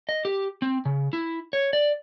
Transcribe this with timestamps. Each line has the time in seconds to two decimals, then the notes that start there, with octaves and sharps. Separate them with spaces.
0.09 D#5
0.25 G4
0.62 C4
0.85 C#3
1.13 E4
1.53 C#5
1.73 D5